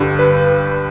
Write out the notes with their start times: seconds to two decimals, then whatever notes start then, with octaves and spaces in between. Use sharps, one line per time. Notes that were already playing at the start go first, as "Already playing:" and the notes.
Already playing: G2 D3 G3
0.19 B4